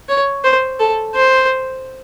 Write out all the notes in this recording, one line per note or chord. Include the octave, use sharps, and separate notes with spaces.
C#5
C5
A4
C5